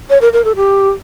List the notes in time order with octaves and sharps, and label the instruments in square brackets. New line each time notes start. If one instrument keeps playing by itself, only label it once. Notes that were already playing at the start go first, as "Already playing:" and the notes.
[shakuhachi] C#5
A#4
A#4
A4
G4